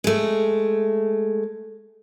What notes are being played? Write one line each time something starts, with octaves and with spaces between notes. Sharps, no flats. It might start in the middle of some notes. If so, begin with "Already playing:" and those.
G#3 A3